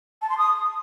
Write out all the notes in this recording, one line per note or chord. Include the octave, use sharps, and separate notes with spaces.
A5
C6
D#6